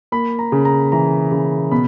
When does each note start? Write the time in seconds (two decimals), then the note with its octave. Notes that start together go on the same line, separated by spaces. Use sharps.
0.12 A#3 B5
0.39 A#5
0.52 C#3
0.65 A#5
0.92 E3 A#5
1.32 C#3
1.71 B2 B5